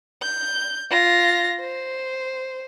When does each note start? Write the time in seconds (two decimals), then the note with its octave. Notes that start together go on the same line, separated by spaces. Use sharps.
0.22 G6
0.91 F4 A#6
1.61 C5